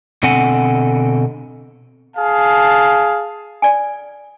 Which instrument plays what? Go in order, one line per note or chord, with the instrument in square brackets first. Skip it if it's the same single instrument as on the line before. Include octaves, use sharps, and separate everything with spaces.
[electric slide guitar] B2 D3 C4 A4 F#5 G#5
[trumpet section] G#4 F5 A5
[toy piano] D5 G#5